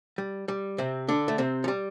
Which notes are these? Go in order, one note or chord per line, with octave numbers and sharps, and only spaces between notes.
G3
G3
C3 C4
D3 D4
A3
C3 C4
F3
G3